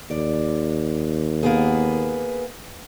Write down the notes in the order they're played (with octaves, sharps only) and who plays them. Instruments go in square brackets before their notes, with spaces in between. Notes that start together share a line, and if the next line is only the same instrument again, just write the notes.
[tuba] D#2 [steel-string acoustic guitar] D5
[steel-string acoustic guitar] A#3 B3 G#4